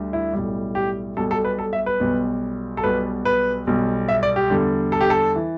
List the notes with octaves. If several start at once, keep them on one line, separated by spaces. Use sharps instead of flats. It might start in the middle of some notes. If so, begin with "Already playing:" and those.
Already playing: D2 D3 G3
E4
B1 A2 G3
G4
B1 B2 G3 A4
A4
B4
A4
E5
B4
B1 B2 G3
A4
B1 B2 G3 B4
B4
B1 B2 G3
E5
D5
G4
E2 D3 G3
A4
G4
A4
E3